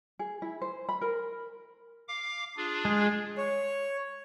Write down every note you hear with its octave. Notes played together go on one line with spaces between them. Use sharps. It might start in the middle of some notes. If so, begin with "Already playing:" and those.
G#4
E4
C5
B5
A#4
F5 D6
D4 F4 G#4
G#3
C#5